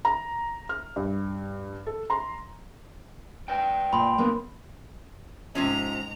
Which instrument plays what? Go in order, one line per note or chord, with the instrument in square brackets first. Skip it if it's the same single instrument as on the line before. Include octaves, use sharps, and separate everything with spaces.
[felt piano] A#5
F6
G2
A4
A#5 C6
[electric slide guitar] B4 D5 G5
[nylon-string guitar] A#2 [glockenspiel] B5 C6
[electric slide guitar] C3 D4 [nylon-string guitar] A#3 B3
[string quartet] G#2 A#5 [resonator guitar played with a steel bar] C3 F3 C#4